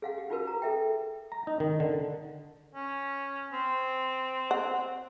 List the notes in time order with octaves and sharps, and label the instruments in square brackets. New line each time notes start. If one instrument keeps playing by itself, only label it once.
[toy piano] G#4 F5 F#5
G4
D#4 F4 F#4 G#4 A#4 B4
A#5
G#4 A4 E5 G5
[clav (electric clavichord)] A#5
D#4
D#3
D3
[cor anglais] C#4
C4
[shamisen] F#5